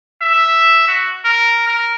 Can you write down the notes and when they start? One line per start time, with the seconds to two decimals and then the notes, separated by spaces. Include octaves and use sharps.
0.22 E5
0.88 F#4
1.24 A#4
1.67 A#4